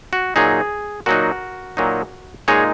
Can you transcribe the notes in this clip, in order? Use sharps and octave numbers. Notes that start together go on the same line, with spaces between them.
F#4
A#2 F#3 D#4 G#4
A#2 F#3 D#4 F#4 A#4
A#2 F#3 D#4
A#2 G#3 D#4 G#4 C#5